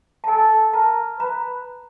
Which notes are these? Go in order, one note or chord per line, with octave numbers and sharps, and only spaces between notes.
A5
A4 G#5
A#4 A5
B4 A#5